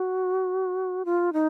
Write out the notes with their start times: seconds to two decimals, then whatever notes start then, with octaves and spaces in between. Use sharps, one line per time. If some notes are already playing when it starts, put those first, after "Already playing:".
Already playing: F#4
1.05 F4
1.33 D#4